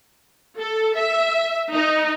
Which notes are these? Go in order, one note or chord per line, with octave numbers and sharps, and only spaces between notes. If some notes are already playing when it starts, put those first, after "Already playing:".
A4
E5
D#4